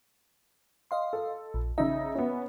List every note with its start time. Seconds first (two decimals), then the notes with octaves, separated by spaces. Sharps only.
0.91 D#5 F5 C6
1.13 A4
1.54 A#1
1.78 C#3 D#4 E5
2.15 B3 C#4